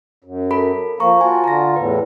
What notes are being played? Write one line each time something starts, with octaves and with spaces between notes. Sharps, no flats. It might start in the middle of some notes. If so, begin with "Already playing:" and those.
F#2
A4 A#4 B5
F3 A#3 A#5 C#6
F4 F#4 G#5 A5
D3 F4 A#5 A#6
E2 A2 B4